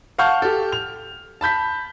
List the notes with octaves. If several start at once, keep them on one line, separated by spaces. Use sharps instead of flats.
F5 F#5 A5 C#6 F6 G6
G4 A4
F7
A5 B5 G6 B6